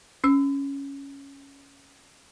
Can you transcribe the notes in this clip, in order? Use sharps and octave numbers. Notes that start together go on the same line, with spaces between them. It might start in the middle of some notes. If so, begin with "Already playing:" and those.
C#4 E6